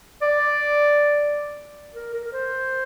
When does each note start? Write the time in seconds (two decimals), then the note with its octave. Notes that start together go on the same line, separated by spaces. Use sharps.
0.22 D5
1.94 A#4
2.14 A#4
2.25 A#4
2.33 C5